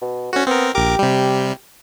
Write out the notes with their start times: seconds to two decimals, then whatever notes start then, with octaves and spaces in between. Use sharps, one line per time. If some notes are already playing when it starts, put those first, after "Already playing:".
0.02 B2
0.33 D2 C#4 F#4
0.47 B3 C4 A#4
0.75 A#1 G4 A#4 D6
0.99 C3 G3